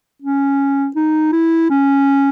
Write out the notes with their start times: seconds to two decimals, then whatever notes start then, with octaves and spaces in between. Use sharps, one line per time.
0.22 C#4
0.96 D#4
1.33 E4
1.70 C#4